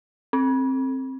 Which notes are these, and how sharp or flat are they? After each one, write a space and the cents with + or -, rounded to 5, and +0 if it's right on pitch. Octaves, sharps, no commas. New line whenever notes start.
C4 +15